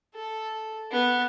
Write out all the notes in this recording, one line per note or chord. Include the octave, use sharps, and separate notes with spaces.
A4
B3